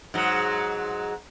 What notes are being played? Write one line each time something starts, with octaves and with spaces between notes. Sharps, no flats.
G#2 F#3